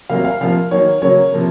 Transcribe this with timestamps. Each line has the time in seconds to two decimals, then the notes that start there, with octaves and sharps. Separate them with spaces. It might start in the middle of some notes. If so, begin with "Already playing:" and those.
0.09 C3 F#3 A#3 F5
0.25 F5
0.41 C3 F3 A#3 F5
0.71 D#3 F#3 A#3 C#5
1.02 C#3 F#3 A#3 C#5
1.32 C3 F3 A#3